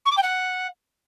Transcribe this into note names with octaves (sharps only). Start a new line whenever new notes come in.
C#6
D6
G5
F#5